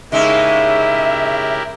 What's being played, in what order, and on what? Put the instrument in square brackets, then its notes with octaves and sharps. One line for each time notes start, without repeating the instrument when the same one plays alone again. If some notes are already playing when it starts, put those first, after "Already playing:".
[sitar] C#3 G#3 D#4 [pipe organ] E4 G4 A#4 [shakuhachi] E5